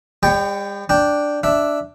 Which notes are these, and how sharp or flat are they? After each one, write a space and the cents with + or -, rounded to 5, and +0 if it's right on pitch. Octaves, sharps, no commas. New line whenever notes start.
G3 +45 C#5 +5 G5 +0
D4 +0 G5 +0
D4 +0 E5 +0